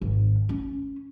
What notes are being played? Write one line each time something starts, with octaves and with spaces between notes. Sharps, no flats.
G#1
C#4